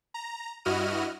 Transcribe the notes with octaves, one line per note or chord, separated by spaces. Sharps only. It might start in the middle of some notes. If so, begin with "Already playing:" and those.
A#5
G2 E4 F#4 D#5 F6 D#7